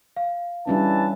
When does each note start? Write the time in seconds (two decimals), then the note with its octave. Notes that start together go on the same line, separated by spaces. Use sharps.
0.17 F5
0.67 E3 G3 C#4 D4 A5